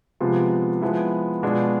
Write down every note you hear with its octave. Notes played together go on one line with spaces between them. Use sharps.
C3 F3 G#3 B3 F4
F3 G#3 B3 E4
B2 G#3 B3 D4 F4